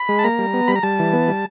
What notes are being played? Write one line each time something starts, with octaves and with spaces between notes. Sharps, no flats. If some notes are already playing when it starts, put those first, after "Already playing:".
Already playing: B5
G#3
A5
A#3 A#5
G3
B3
G3 B5
A#5
G3 A5
E3
B3
G3